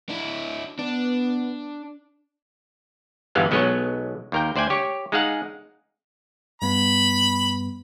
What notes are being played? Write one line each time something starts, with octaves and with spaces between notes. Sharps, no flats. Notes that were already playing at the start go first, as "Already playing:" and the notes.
D4 E4
B3 D4
G1 G2 E3 G#3 B3 F5
B1 F#3 G#3 B3 C#5 D#5
D#2 A#4 G5
D2 C5 D5 G5 G#5
G4 C#5
G#3 D#4 G#4 F5 F#5
G2 G3 B3 B5